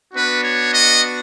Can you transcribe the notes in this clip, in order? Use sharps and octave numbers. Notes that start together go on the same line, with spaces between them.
B3 D4 F#4 B4
C#5
D#5